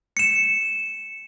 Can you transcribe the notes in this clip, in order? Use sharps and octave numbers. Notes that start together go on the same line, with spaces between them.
C#7 E7